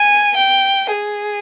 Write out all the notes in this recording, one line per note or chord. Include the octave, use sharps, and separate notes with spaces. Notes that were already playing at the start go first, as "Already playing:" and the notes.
Already playing: G#5
G5
G#4